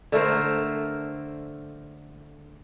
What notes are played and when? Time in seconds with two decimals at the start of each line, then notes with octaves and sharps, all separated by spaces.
0.12 D3 A3 A#4 C5